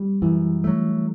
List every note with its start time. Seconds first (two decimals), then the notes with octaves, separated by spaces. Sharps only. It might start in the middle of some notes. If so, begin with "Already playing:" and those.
Already playing: G3
0.22 F#2 E3
0.64 F#3 A3